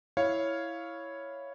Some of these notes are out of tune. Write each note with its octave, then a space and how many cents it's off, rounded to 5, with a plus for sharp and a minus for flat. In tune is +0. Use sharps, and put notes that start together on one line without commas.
E4 +0 C#5 +0 F5 +0